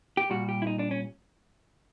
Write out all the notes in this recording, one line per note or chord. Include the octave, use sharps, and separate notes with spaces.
G4
A#2 G3 F#4
G4
E4
D#4
D4
C#4